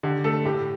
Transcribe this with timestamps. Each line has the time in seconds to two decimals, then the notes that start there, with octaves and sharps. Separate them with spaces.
0.03 D3 G4
0.24 A3 A4
0.45 A2 G4